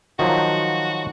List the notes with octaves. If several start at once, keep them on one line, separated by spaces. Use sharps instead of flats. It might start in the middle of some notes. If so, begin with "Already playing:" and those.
D#3 F3 F#3 F#4